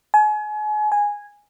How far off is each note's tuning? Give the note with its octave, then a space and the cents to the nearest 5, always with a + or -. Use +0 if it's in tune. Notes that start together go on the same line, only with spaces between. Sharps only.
G#5 +35
G#5 -10